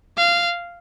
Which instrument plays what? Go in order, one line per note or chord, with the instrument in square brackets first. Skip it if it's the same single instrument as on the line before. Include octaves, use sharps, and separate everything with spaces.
[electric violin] F5